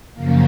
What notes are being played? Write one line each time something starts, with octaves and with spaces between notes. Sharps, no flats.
F#2 C#3 F3 A#3